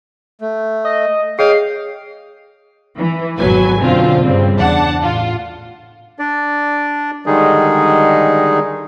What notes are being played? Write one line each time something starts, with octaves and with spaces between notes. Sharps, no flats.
A3
D#5
G#4 C#5 D#5 F5 G5 D#6 C7
E3
G#1 F2 B2 F#3 B4 G#5
F#2 B2 D3 C4 F4
G2 C#3 G3 C4
E2 D4 F#5 A5
A1 F4
D4 D5
D3 D#3 G3 G#3 D#4 G#4